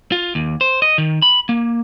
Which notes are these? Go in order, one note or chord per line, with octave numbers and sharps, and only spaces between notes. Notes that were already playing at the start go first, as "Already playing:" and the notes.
F4
D#2
C5
D#5
D#3
B5
A#3